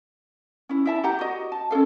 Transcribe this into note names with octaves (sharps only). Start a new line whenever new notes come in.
C#4 E4
E4 E5 A5
G4 F#5 A#5
F#4 D#5
A5
C#4 F4 A4 F5